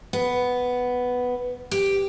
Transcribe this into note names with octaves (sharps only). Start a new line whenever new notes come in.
B3
G4